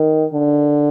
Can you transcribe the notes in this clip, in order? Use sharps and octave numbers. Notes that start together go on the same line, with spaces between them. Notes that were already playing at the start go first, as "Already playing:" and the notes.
Already playing: D#3
D3